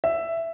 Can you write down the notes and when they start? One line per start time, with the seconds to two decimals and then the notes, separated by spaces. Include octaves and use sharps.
0.04 E5